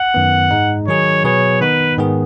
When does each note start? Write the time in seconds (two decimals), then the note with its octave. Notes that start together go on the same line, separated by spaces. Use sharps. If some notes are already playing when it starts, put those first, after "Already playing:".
Already playing: F#5
0.14 F#2 D#3 B3
0.51 G#2 G#3 D#4
0.87 D#3 F#3 D#4 G#4 C#5
1.24 B2 F#3 B3 G#4 B4 C#5
1.61 D#3 B3 D#4 B4
1.98 G#2 D#3 B3 G#4